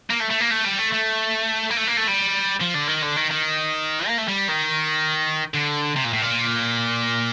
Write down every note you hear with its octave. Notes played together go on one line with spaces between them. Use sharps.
A#3
A3
A3
A#3
A3
G3
A3
A3
A#3
A3
A#3
A3
G3
F3
D3
D#3
D3
D#3
D#3
A#3
A3
G3
D#3
D3
C3
A#2
A2
A#2